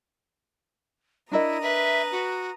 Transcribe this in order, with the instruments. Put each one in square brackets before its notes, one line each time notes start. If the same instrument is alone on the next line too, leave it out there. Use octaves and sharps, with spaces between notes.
[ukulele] D4 A#4 D#5 [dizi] E4 [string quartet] A#5 D#6
[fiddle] B4 [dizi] E5
[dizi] F#4